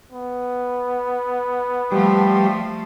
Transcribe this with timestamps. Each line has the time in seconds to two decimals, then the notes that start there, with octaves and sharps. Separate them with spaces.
0.13 B3
1.92 F3 G3 A3